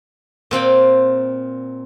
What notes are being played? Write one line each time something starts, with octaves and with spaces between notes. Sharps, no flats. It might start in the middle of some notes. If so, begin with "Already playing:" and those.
A#2 C4 F5 G5